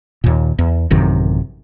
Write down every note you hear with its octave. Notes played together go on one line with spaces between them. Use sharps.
D#2 A#2
E2
A1 F#2 C3 D#3